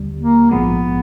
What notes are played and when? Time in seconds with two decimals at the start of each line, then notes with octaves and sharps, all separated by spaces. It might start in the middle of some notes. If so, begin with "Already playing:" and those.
Already playing: D#2 D3 G3
0.20 A#3
0.50 A#1 G#2 F3 G#3 B3